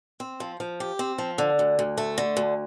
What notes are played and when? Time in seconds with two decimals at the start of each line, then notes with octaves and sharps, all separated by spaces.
0.20 C4
0.40 F3
0.60 F3
0.80 G4
0.99 C4
1.18 F3
1.38 D3
1.59 D2
1.79 D2
1.97 A3
2.18 D3
2.37 D2